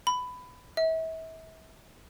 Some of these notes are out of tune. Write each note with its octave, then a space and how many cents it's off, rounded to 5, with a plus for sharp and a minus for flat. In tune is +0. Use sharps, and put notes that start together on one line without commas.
B5 +15
E5 -35